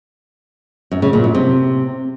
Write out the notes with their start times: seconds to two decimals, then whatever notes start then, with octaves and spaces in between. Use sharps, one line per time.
0.92 F#2
1.02 C#3
1.13 A#2
1.24 F#2
1.35 C3